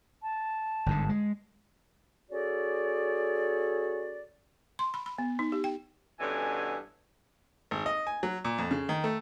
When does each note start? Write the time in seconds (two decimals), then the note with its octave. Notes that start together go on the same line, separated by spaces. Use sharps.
0.23 A5
0.86 G1 G#2 D3
1.09 G#3
2.31 C#4 F#4 G#4 A4 D5
4.79 C6
4.94 B5
5.06 B5
5.18 B3
5.39 D#4
5.52 G4
5.64 G5
6.20 G2 B2 D3 E3 C#4 G#5
7.71 G#1
7.86 D#5
8.07 G#5
8.23 F#3
8.45 A#2
8.58 F2
8.71 C#3
8.89 D#3
9.04 A3